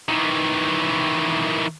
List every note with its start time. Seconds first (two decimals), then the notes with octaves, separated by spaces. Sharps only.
0.08 D#3 E3